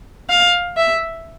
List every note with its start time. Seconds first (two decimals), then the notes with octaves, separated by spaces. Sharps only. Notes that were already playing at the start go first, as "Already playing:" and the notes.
0.29 F5
0.77 E5